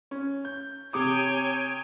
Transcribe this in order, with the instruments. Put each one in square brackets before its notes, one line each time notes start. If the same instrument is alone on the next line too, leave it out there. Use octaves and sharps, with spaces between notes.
[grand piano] C#4
G6
[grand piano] C3 D6 D#6 [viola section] C#5 G5 G#5